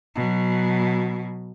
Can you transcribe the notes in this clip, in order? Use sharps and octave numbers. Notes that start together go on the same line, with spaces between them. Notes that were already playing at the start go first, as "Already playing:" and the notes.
B2 F#3